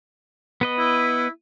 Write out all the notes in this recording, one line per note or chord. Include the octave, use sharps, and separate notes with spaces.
B3 B4 D#5
E4